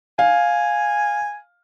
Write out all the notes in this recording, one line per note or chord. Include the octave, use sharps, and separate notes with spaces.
F5 G#5